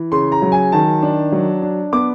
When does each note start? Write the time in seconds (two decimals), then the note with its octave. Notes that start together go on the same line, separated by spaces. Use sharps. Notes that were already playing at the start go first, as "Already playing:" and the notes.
Already playing: E3
0.12 C#3 C6
0.32 A#5
0.42 F#3
0.52 G#5
0.72 D#3 A5
1.03 D4
1.32 F#3
1.62 D4
1.93 B3 D6